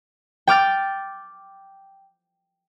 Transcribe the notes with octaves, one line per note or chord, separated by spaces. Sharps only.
G5 D6 F6 A6